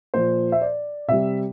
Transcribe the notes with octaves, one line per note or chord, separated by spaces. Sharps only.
A#2 F3 C5
E5
D5
C3 G3 E5